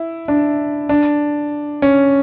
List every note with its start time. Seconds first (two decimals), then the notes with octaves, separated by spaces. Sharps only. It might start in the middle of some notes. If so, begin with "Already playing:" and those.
Already playing: E4
0.28 D4
0.89 D4
1.82 C#4